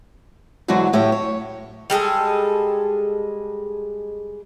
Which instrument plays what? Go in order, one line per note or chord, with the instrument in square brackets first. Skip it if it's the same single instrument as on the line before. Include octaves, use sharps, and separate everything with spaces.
[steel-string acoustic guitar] G#2 D3 E3 F#3 D4 F#4
A2 E4 G4 C#5
C#5
[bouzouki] G3 G#3 G#4 A4